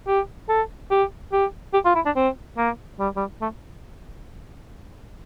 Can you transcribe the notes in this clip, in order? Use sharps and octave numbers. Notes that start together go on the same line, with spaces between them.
G4
A4
G4
G4
G4
F4
E4
D4
C4
A#3
G3
G3
A3